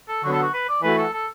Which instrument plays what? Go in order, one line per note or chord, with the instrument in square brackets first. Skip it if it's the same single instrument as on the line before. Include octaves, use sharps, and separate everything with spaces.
[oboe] A4
[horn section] D3 F#3 B3 [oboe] F#4
[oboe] A4
F#4
B4
D5
[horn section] E3 A3 F#4 [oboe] B4
[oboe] A4
A4